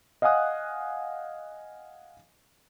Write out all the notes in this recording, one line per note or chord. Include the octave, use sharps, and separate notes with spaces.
D#5 F5 F#5 G#5 D#6 F#6